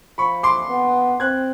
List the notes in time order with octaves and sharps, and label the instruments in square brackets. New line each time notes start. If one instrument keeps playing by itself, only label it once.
[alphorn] F3 [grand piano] B5 C#6
[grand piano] C6 D6
[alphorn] B3
[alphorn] C4 [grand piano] F#6 G#6